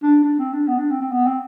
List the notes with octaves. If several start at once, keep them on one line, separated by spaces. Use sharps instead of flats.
D4
D4
C4
D4
B3
D4
C4
C4
B3
C4